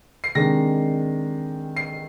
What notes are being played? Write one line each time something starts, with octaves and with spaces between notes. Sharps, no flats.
C7
C3 D#3 G#3 D4 A#6
C7